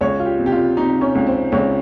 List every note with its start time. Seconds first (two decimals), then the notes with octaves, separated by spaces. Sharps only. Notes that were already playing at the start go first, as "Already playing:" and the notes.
0.01 C#2 C#5
0.20 F4
0.26 G4
0.39 C3
0.46 G4
0.52 F4
0.77 C3 D#4
1.01 C#4
1.15 C#2
1.27 C4
1.52 C#2 C#4